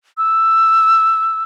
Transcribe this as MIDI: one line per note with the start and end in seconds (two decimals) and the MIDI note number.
0.18 1.44 88